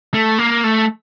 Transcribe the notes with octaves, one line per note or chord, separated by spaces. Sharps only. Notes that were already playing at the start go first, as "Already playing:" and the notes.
A3
A#3
A3